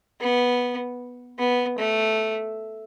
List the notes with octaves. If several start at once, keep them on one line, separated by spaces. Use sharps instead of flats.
B3
B3
A3